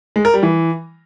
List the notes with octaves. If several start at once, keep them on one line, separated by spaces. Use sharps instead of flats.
G#3
A#4
G3
E3